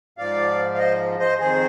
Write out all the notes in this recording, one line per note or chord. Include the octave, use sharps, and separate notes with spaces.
G#2 F3 D5 F5
F5
C5 D#5
C5 D#5
F2 D#3 G#4 C5